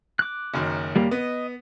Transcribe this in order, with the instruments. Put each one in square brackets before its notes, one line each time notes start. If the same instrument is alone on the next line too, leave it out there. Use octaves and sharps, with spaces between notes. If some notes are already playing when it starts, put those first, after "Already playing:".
[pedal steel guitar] D6 F#6
[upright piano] F#1 F#2 D#3
[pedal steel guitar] G3 A#3
[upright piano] B3 [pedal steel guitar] D#5